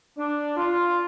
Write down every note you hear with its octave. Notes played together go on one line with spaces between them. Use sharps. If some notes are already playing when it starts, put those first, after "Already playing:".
D4
F4